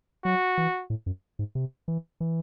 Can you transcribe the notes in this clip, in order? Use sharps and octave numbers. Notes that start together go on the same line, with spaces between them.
F#3 F#4
E3
A2
F#2
G#2
C3
E3
E3